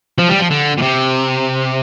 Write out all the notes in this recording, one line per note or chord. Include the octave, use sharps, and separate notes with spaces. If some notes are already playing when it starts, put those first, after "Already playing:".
F3
G3
F3
D3
A#2
C3